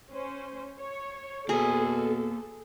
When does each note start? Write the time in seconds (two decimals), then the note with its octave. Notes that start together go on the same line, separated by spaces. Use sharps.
0.10 C#4 C5
0.78 C#5
1.49 B2 A#3 G#4 A4 C#5